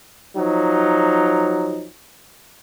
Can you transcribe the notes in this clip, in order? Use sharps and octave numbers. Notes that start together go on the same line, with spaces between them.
F3 F#3 D#4